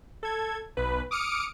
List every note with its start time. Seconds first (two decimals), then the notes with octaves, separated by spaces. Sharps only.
0.23 A4 G#6
0.77 B1 B4
1.11 D6 D#6 F6 C#7 D7